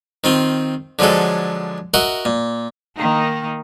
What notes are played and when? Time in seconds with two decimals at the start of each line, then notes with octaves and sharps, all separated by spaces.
0.24 D#3 C4 F4
0.99 D3 F3 F#3 G#3 A4
1.94 F#4 A#4 D#5 E5 F#5
2.25 A#2
2.96 D#3 A#3 D#4